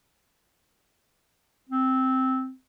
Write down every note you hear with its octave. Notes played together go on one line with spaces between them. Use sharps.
C4